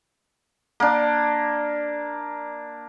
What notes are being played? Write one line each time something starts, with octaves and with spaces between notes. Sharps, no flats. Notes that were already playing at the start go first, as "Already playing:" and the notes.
A#3 D4